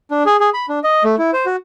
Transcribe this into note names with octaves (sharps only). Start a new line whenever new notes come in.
D4
G#4
G#4
B5
D4
D#5
A3
E4
C5
F#4